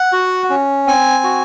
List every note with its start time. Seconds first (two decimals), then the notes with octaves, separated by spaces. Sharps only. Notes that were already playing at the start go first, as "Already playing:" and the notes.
Already playing: F#5
0.13 F#4
0.50 C#4
0.87 C4 G#5
1.24 F#4